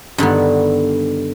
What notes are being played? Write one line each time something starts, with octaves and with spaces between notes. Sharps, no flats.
G2 D3 D#3 B3